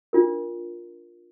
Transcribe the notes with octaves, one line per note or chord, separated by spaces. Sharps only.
D4 F4 A#4